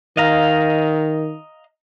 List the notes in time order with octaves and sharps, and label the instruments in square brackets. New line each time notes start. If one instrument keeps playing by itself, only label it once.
[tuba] D#3 [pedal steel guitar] D#5 F5 A#5